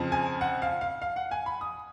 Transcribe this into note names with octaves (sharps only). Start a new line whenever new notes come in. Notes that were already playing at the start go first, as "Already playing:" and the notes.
Already playing: F2 C#3 F3
G#5
F#5
F5
F5
F5
F#5
G#5
B5
D#6